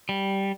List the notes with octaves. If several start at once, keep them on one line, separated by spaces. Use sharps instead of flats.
G3